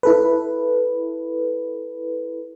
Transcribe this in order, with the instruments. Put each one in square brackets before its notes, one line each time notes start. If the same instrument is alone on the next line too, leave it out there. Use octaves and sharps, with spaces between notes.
[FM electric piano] E4 A4 B4